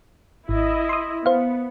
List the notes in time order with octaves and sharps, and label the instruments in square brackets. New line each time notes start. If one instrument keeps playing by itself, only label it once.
[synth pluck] G#1 [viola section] E4 D#5
[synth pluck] C6 D#6
[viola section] B3 [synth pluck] C5 F5